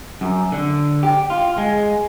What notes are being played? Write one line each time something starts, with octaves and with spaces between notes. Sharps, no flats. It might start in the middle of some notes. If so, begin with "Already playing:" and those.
F#2
D3
G4
F4
G#3